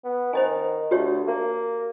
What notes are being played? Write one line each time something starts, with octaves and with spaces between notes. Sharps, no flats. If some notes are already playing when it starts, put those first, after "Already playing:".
B3
D#3 C5 D#5 G#5
D2 F#4 G4 C#5
A#3